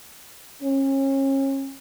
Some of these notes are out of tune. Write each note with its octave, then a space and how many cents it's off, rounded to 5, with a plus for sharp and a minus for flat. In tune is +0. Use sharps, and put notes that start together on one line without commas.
C#4 -35